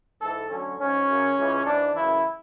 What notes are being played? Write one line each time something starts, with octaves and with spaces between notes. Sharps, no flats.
G#2 E3 A4
D2 D3 F#3 C#4
G#2 F#3 C#4
F#2 C#3 F#3
C#2 C#3 E3
G#2 E3 D4
F#2 C#3 E3 E4